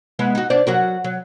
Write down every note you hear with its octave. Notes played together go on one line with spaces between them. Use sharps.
G#3 B3 E4
D#4 F#4
D4 C5 D5
F#3 F#4 A#4
F#3